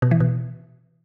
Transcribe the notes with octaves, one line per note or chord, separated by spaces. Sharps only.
B2
E3
B2